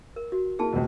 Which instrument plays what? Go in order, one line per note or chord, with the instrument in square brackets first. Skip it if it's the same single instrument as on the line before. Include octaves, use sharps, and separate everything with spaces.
[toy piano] A#4
F#4
[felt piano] A#3 E4 [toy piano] G#4 A5
[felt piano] E1 C#2